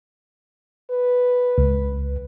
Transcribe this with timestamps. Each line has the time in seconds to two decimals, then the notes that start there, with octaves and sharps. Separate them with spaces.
0.91 B4
1.58 C#2